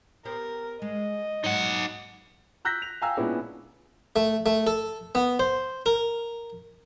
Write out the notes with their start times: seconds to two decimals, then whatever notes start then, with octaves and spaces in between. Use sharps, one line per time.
0.25 B3 G4 A#4 C5
0.82 G#3 D#5
1.44 G#2 F#3 D#4 C#5 F#5
2.65 A#5 E6 F#6 G6 A#6 B6
2.82 F7
3.02 F5 G5 G#5 A#5 E6
3.17 A#2 G#3 B3 C#4 D4 E4
4.16 A3
4.46 A3
4.67 A4
5.15 B3
5.40 C5
5.86 A#4